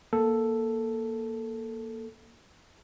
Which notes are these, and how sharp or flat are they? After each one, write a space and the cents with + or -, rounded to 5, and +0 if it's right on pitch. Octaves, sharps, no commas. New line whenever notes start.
A#3 +10 A4 +0